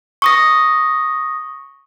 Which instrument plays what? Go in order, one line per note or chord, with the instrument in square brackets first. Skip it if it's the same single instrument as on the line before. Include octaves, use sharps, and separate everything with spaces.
[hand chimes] C#6 D#6 A#6